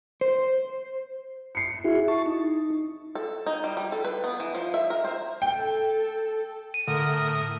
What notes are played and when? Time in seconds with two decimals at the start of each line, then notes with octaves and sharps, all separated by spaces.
0.21 C5
1.55 C7 C#7
1.84 E4 F#4 G#4
2.08 A5 C#6
2.26 D#4
3.15 A4
3.46 D#4
3.64 G3
3.77 G3
3.92 A4
4.05 B4
4.24 B3
4.40 E3
4.55 F3
4.74 E5
4.90 A#4
5.05 C5
5.42 A4 G5
6.74 D#7
6.88 A2 D3 A#4 D#6